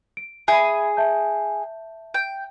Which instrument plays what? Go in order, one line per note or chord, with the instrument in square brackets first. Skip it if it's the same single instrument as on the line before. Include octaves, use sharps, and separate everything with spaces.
[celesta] D7
[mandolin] G#4 G#5 [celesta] E5 B5
[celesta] E5 A5 G6
[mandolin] G5